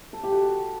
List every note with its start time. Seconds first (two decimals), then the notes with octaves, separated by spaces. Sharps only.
0.13 A4
0.23 G4
0.32 F#4